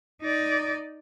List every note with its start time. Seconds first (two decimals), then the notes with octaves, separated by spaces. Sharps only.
0.22 D#4 D5